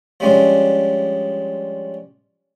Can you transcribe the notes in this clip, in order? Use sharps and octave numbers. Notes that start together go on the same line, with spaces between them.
F3 G3 G#3 C#4 D4